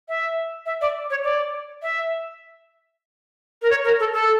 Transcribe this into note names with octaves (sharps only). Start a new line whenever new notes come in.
E5
E5
D5
C#5
D5
E5
A#4
C#5
A#4
A4
A4